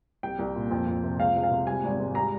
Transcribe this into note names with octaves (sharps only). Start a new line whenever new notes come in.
C2 G5
C2
A#2
F2
F2
C3
C#2 F5
C#2
F5
C3
G3 G#5
G#1
G#2
G3 A#5